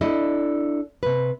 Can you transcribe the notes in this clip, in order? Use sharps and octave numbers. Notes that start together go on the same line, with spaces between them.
D4 E4 A4 D5 D#5
C3 B4